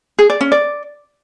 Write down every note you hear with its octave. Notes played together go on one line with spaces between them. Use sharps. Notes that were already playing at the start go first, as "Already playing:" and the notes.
G#4
D5
C#4
D5